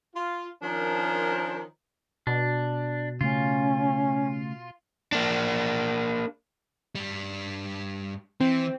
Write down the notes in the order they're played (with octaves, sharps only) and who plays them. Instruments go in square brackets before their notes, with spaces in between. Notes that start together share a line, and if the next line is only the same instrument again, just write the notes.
[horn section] F4
D#3 F3 C#4 D4 A#4 C5
[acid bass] B2 [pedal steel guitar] D4
[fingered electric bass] C#3 A3 [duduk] C#4 [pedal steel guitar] F4
[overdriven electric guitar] A#3 D4
[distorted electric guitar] G2 G3
[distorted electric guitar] E3 [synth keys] C4